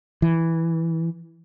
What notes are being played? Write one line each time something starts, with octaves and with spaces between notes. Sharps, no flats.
E3